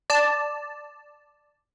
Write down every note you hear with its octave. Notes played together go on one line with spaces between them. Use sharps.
D5 A5